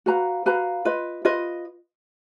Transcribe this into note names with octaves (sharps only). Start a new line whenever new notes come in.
F#4 B4 F5 A#5
F#4 B4 F5 A#5
F4 B4 D#5
F4 B4 D#5